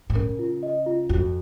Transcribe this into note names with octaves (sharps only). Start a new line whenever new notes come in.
B2
C#3 A#4
F4
D#5
F4
F2 F#4